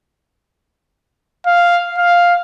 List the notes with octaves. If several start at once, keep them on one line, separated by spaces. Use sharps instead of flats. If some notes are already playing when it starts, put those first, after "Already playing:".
F5
F5